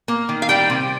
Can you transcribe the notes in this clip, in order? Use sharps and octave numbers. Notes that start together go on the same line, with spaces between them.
A#3
D#3
F5
G3 G5
C3